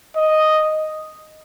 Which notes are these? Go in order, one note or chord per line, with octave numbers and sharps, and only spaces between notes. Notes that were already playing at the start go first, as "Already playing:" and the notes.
D#5